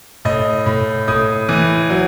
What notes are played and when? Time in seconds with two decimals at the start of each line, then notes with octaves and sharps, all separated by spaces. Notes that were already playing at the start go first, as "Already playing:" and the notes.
0.25 A2 D#5
0.66 A2
1.08 A2 D#6
1.49 E3
1.90 F#3